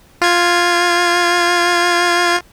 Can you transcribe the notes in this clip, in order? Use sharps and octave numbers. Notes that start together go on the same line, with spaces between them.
F4 G#6